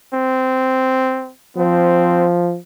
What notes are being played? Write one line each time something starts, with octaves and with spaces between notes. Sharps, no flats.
C4
F3 C4